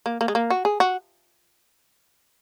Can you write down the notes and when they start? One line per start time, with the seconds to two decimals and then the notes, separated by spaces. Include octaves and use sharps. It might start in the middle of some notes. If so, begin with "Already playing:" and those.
0.06 A#3
0.21 A#3
0.28 G#3
0.35 A#3
0.50 F#4
0.65 G#4
0.80 F#4